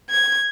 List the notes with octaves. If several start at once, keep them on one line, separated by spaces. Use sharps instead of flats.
G#6